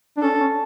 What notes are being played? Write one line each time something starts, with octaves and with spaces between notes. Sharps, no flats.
D4
C#4 A4
C#4